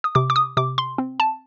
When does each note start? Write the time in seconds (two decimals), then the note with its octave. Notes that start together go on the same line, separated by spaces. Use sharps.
0.04 D#6
0.15 C3 D6
0.30 D6
0.36 D#6
0.57 C3 D6
0.78 C6
0.98 C4
1.20 A5